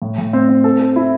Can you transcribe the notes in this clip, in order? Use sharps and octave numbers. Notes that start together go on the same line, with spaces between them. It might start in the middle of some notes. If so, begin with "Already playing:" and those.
A2
A2
C4
C4
A4
A4
E4